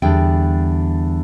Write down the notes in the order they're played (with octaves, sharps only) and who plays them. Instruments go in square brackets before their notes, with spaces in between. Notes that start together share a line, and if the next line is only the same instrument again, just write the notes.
[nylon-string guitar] E2 D3 G3 D4 G5